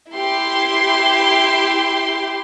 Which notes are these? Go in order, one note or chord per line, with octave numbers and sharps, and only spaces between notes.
E4 G4 C6